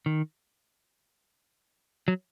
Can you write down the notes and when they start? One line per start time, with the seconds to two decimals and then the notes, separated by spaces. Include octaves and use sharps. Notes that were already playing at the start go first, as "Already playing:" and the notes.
0.06 D#3
2.08 F#3